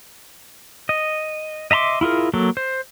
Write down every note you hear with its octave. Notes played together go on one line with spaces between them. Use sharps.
D#5
D#5 E5 A#5 C6 D6
E4 F4 G#4 A#4
F#3 A#3 A4
C5